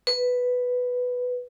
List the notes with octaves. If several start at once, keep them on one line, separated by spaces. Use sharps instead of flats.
B4